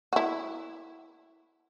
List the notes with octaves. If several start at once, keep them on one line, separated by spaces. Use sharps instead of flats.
E4 F#4